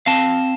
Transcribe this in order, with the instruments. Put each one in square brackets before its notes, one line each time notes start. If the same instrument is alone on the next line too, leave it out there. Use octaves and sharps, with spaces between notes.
[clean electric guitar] C4 F5 A5